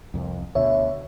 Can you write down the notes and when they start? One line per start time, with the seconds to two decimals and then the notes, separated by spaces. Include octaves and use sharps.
0.14 C2 F2
0.55 D2 B2 D3 C#5 E5